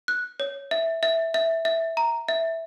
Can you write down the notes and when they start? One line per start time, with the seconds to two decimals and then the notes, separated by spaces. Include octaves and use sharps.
0.08 F#6
0.40 C#5
0.71 E5
1.03 E5
1.34 E5
1.65 E5
1.97 A#5
2.28 E5